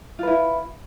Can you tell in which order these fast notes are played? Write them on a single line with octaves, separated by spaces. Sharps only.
F4 B4 E4